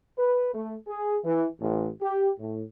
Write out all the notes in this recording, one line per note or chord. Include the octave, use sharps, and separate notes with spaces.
B4
A3
G#4
E3
A1
G4
A2